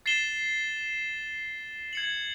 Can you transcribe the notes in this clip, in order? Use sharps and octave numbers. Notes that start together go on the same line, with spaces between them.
A6 C7 E7 G7
G#6 C#7 F#7